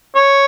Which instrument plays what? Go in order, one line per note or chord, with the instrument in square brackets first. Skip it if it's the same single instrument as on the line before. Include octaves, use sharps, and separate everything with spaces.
[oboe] C#5